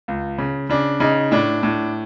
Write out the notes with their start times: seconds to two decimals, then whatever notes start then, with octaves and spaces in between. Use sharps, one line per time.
0.08 C#2
0.38 C#3
0.69 C#3 D4
1.00 C#3 D#4
1.31 A2 D4
1.63 A2